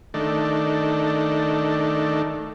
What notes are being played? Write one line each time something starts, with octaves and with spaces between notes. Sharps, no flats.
D#3 A3 D4